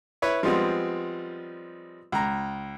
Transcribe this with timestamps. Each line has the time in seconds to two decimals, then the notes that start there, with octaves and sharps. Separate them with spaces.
0.22 E4 B4 C#5
0.43 F3 G3 G#3 B3 C4
2.12 C#2 A#5